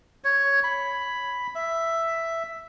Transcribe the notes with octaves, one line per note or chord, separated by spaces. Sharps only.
C#5
B5
E5